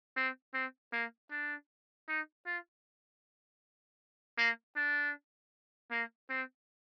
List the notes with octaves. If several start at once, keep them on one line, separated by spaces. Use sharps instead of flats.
C4
C4
A#3
D4
D#4
F4
A#3
D4
A#3
C4